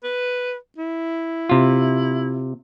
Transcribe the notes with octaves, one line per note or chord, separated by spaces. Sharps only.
B4
E4
C3 F4